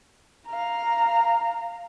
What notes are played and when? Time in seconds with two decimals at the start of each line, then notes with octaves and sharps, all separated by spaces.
0.47 F5 A#5